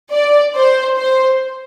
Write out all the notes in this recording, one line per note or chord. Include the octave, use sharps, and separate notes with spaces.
D5
C5
C5